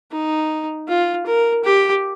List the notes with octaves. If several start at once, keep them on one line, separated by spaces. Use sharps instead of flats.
D#4
F4
A#4
G4